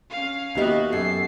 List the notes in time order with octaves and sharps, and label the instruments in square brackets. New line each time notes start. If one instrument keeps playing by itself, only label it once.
[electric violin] C#4 F5
[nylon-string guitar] D#2 E5 [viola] B3 F#4 [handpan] D#4 G4 D#5
[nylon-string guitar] F#2 [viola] A4 [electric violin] C7